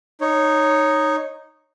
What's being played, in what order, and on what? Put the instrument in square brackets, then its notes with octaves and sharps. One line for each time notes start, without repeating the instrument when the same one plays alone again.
[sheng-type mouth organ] D#4 C#5